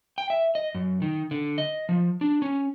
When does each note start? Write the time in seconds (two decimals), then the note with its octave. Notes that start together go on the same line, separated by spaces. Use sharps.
0.18 G5
0.30 E5
0.55 D#5
0.75 F#2
1.02 D#3
1.31 D3
1.58 D#5
1.89 F3
2.21 D4
2.42 C#4